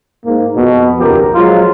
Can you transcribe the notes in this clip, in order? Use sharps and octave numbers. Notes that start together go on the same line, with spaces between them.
G#2 A#3
F2 B2
A#1 D#2 C#3 F3 G4 A#4
F3 F#3 G#3 F4